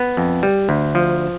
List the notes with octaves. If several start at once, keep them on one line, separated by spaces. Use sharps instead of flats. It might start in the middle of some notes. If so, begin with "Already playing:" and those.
Already playing: B3
F2
G3
D2
F3